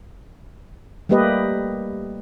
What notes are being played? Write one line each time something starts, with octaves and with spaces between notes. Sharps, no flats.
G3 A3 A#3 G4 B4 D#5